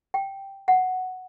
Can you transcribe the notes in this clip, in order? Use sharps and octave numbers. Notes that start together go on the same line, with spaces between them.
G5
F#5